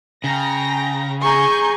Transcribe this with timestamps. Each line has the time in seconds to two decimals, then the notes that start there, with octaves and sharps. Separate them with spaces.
0.24 C#3 G5 A#5 A#6
1.22 G#4 G#5 A#5 C#6 G6